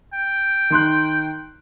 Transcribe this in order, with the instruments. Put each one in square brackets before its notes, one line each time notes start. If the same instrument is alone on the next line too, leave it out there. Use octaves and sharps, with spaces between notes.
[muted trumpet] G5
[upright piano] D#3 C6 F#6